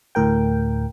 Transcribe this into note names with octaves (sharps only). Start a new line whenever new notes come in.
D2 A2 A#4 G5